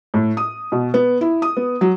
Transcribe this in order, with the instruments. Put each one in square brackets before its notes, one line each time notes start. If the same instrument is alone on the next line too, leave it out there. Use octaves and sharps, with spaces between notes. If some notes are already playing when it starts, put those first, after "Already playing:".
[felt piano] A2
D#6
B2
B3
E4
D#6
B3
F#3